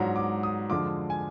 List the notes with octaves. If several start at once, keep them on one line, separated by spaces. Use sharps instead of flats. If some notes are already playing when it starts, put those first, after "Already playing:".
Already playing: G#2 F#3 D4 F4 A#5
D6
D#6
F2 D3 G#3 D4 F4 D6
G#5